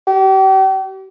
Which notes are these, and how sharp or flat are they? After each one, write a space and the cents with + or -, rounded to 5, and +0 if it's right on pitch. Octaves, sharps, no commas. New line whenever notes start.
G4 -40